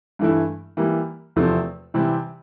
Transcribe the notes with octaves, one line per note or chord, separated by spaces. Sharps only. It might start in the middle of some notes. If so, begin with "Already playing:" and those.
G2 E3 A3 E4
E3 G3 A#3
E2 C3 F3 A3 C4
C3 E3 G3 C4 E4